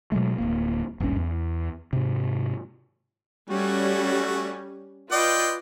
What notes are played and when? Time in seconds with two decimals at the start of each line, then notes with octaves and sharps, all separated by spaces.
0.12 B2 F#3 G#3 A3
0.38 D1 C#2 A#3
1.00 D#1 G#1 G2 C#4
1.17 E2
1.93 G#2 C3
3.51 G3 A3 C#4 F#4
5.12 F4 B4 D5 D#5 G5